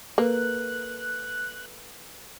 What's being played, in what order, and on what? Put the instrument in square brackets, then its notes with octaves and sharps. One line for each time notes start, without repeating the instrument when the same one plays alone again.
[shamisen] A#3 [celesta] A4 B4 [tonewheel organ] F#6